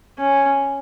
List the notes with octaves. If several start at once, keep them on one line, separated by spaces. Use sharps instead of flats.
C#4